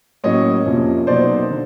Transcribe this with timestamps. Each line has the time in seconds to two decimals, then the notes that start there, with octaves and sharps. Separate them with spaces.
0.24 A2 F#3 A#3 C#4 C#5 D#5
0.66 F2 C3 F3 A#3 C#4
1.07 B2 F#3 A#3 D#4 C5 D5
1.51 D3